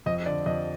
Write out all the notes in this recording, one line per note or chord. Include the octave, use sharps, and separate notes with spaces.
F2 D#5
D3 D5
F2 D#5